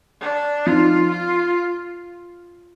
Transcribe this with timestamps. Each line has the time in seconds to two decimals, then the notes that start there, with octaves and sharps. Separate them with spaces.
0.21 D4
0.66 F3 C4 D#4 F4
1.11 F4